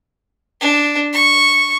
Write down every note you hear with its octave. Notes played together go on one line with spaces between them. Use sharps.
D4
C#6